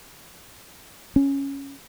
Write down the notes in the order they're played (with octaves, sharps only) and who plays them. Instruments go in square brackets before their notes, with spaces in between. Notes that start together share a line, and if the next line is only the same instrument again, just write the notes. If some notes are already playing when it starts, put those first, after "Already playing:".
[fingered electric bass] C#4